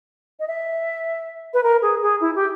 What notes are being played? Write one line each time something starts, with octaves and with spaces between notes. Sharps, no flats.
D#5
E5
B4
A#4
G#4
G#4
E4
G4